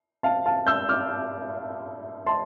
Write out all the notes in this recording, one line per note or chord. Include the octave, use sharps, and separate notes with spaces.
F5 A5
F5 A5
E6 G6
D6 F6
A5 C6